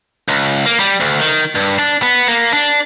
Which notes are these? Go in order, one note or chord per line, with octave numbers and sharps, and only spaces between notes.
C#2
A#3
G3
D2
D#3
G2
D4
B3
A#3
D4